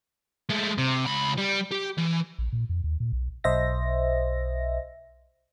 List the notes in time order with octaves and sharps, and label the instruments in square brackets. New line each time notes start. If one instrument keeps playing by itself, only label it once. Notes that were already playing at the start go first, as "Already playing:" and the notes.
[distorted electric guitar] G#3 A3
C3
C#2 B5
G3
G4
E3
[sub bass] A#1
A#2
F2
D#2
A#2
B1
[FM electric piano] B1 C5 D#5 E5 A#6